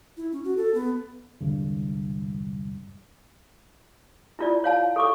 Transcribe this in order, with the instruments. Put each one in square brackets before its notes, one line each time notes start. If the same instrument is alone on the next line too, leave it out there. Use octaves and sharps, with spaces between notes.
[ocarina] E4
C#4
F#4
A4
B3
[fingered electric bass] E1 C2 G2 D3
[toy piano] E4 F4 D5
C#5 F5 A5
A4 C#6 D6